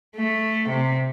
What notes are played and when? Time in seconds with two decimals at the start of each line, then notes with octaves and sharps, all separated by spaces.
0.16 A3
0.69 C3